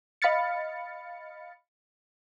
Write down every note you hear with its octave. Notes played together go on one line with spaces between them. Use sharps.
D#5 F5 B5 F6 A6 C#7